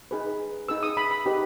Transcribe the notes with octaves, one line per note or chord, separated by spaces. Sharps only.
D#4 G#4 B4
D#4 G#4 B4 E6
D#6
B5
B5
D#4 G4 B4